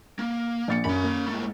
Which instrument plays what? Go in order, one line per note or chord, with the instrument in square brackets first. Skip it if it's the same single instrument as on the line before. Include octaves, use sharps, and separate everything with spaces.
[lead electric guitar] A#3
[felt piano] A#1 A6 C#7
[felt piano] F#2 [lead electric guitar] C#4 B5
[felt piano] A#3
[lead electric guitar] G#2 A3